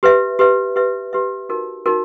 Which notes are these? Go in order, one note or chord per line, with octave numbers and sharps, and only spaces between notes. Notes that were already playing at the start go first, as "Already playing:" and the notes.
G4 B4 E5
G4 B4 E5
G4 B4 E5
G4 B4 E5
D#4 F#4 A#4
D#4 F#4 A#4